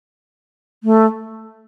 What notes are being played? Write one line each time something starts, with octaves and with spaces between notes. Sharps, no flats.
A3